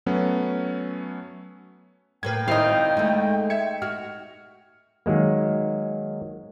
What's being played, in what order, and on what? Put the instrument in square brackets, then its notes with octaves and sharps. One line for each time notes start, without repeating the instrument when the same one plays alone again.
[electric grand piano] F#3 A3 B3 C#4
[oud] A2 A#3 B4 [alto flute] G5 [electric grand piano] G#6
[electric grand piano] G#1 E4 [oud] C4 [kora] D#4 F5
[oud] G#3 A3
[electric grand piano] E5 G#6 C#7
[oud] F#4 [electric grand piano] F6
[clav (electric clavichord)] D#3 F#3 G#3 A#3